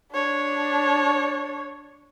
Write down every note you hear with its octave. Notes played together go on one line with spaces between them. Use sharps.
D4 C#5